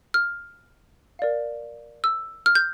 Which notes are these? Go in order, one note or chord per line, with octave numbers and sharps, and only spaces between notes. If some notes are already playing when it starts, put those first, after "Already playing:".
F6
A#4 D5 F5
E6
F6
G6